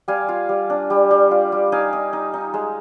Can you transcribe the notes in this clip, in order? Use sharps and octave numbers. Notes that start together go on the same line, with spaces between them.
G3 F5 G#5
F4
G3
D4
G3
G3
F4
G3
D#4 F5 G#5
D#4
D#4
D#4
G#3